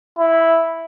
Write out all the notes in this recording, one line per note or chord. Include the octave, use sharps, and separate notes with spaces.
E4